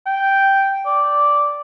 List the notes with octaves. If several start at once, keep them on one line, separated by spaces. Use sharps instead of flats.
G5
D5